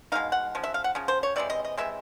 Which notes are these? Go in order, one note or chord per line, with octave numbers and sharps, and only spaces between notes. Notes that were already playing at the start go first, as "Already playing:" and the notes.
B2 G#3 C4 D#4 F5
F#5
C#3 F3
E5
F5
F#5
C#3 F3
C5
C#5
C3 E3 G#3 D5
D#5
D#5
C3 E3 G#3 E5